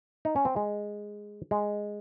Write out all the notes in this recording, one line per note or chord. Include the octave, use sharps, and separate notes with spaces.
D#4
C#4
C4
G#3
G#3